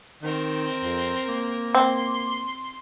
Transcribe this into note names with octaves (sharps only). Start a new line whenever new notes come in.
D#3 C4 A#4
F2
A#3
C4 C6